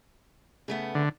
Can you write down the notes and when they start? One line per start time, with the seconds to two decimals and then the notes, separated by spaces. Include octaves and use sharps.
0.68 C#3 A3 B3
0.95 D3